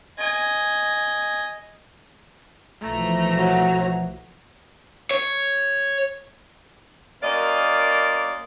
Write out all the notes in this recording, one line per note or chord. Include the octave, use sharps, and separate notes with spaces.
D#5 G#5
B1 E3 F3 A3 A#5
F#3
C#5
F#2 A#3 D5 D#5